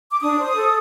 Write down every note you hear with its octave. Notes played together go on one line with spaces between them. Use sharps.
D6
D4 D#6
C5
A4